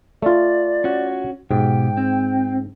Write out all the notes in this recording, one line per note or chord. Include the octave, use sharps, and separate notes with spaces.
A3 F4 D5
C#4 F#4
G#2 B2 G4 G5
C4